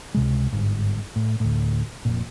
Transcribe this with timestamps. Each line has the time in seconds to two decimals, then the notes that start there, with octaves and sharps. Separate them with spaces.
0.14 C#2 C3 G#3
0.52 G1 G#2
1.16 A2
1.40 D2 A2
2.05 F1 A#2